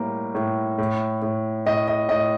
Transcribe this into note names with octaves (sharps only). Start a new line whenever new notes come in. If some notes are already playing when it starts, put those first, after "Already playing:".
Already playing: A2 G3 A#3
A2
A2
A2
A2 D#5
D#5
A2 D#5